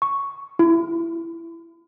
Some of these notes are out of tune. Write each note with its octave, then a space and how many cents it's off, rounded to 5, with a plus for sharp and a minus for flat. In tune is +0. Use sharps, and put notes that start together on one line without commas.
C#6 +0
E4 +20